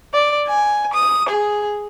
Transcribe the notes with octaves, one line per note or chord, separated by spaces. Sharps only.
D5
G#5
D#6
G#4